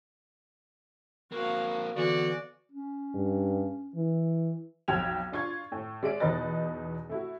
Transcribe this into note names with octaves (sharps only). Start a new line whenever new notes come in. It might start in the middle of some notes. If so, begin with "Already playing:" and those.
A#3 C4 F#4 F5
D3 E3 B3 F#4 D5
C#4
G2
E3
B1 F2 G5 G#6 F7
D4 F4 C#6 G#6
A2
G#3 D5 E5 D7
E2 B2 D#4 B4 D#5 A6
A3 E4 F#4